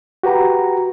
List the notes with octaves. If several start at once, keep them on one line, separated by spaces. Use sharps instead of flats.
F#4 G4 B4 A#5